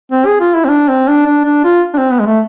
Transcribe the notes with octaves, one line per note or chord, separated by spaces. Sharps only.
C4
G#4
F4
E4
C4
D4
C4
D4
D4
D4
F4
D4
C4
B3
G#3
A3